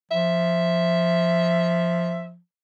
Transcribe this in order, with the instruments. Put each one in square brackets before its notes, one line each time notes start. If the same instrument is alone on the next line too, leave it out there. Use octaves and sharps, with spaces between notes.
[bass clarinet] F3 [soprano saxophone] E5